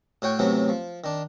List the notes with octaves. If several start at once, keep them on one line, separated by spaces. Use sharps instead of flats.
A2 F#4 C#5 G5
A2 C3 E3 F#3 B3
F3
D#3 D4